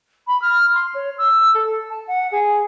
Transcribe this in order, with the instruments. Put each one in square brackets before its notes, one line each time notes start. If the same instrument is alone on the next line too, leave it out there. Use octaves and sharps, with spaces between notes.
[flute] B5
F6
C6
C#5
E6
A4
A5
F#5
G#4